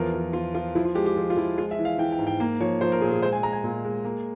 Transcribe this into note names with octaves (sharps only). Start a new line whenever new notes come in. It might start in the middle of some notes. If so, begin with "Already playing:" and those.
Already playing: E2 F3 A#4
F3
F3 F4
F3 F4
F3 E4
F4
G#3 G4
G4
F3
F4
F3 E4
G#3 F4
E5
E3
F5
E3 G5
G5
G#2
G5
A#3
F3 C#5
F3 C5
A#4
A#2 G#4
G#4
G#3 C5
G#5
G#3 A#5
G#5
A#2
G#3
A#3